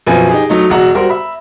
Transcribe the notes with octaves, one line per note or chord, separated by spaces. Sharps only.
F#2 B2 F3 B4 G#5
D#4 G4 G#4
F#3 A3 D#4
E1 F#4 A#5
G3 F#4 A#4 C5
E5 B5